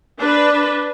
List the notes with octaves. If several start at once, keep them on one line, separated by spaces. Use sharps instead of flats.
D4 B4